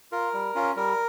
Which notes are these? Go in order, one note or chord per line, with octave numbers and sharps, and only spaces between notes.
F4 A#4
G3
C#4 F4
G3 A#4